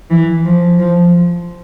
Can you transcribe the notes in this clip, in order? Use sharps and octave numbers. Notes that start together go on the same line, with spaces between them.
E3
F3
F3